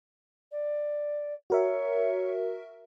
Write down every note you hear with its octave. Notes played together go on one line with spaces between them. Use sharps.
D5
F#4 A#4 C#5 E5